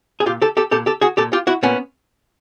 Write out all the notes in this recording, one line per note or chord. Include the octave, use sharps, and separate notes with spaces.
G#4
A#2 F4 G4
G4 A4
G4 A4
A#2 G4 A4
G4 A4
F#4 G#4
A#2 G4 A4
F4 G4
E4 F#4
A#2 B3 C#4